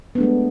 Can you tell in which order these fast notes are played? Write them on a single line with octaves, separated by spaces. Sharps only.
B3 D4 A3 G#3